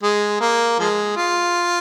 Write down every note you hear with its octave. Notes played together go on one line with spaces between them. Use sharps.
G#3
A#3
F3 G#3
F4